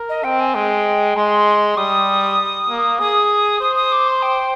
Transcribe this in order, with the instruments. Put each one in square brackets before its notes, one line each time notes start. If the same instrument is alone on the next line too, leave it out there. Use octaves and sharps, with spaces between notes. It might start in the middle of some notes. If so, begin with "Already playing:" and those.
Already playing: [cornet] A#4
[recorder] D#5
[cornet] C4 [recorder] G5
[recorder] G#5
[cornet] G#3 [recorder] G5
[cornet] G#3 [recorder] C6
[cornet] G3 [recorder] D#6
[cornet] A#3
[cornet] G#4 [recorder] D#6
[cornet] C5 [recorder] D#6
[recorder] D#6
D6
C6
G5